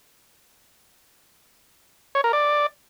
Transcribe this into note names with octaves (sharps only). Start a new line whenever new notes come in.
C#5
A#4
D5